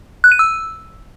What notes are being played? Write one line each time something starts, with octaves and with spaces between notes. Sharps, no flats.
F#6
D#7
E6